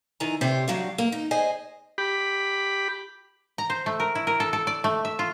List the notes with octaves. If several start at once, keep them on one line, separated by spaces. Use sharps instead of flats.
D#3 E3 G#5 A#5
C3 G4 C5 C#5
G2 F#3 F#4 G4 F5
A#3
D#4
G#4 C5 D#5 G#5
G4 B5
A#5
C5
A3
A#4
E4
A#4
A4
A4
D5
A3
E5
F4